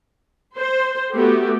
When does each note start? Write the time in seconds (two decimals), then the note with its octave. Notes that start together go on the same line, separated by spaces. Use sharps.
0.57 C5
1.13 A3 B3 F#4 G4